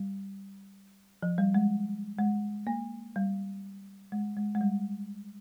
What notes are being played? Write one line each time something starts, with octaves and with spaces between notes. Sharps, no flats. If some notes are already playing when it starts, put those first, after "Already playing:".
Already playing: G3
F3
G3
G#3
G#3
A#3
G3
G#3
G#3
G#3
G3